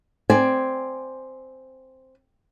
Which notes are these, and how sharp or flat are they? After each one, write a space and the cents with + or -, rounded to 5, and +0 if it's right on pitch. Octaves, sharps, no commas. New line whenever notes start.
C4 +0 D5 +10 G#5 +0